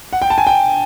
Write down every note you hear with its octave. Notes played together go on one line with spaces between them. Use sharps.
F#5
G5
A5
G#5
G5